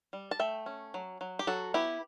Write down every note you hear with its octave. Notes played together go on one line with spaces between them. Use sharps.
G3
A5
A3 E5 G5
C#4
F#3
F#3
G4
F#3 F#4 A4
B3 E4 G4